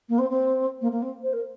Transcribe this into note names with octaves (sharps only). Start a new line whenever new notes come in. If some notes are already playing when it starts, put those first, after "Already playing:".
A#3
C4
C4
A#3
A#3
C4
C5
A#4